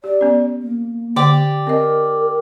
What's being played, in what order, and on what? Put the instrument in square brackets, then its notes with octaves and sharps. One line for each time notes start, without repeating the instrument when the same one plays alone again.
[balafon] G4 [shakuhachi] D5
[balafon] B3 C#4
[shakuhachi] A#3
[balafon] D3 [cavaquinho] G4 D5 D6
[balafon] C4 D#5 [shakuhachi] A#4